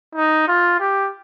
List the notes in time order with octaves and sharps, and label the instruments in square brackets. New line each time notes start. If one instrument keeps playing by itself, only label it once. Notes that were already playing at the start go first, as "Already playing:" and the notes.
[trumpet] D#4
F4
G4